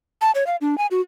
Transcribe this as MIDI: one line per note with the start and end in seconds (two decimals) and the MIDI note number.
0.21 0.31 81
0.35 0.46 73
0.47 0.56 77
0.61 0.78 62
0.78 0.86 80
0.91 1.01 66